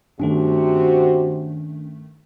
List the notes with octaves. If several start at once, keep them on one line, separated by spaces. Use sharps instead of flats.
G2 C3 D#3 A3 C#4 D4 F#4